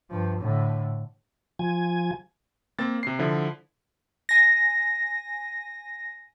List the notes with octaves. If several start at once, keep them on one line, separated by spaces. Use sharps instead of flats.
G2 F3
A2 D3
F3 G#5
A#3 C4 A6
C3 C7
D3 F3 E4
G#5 A#6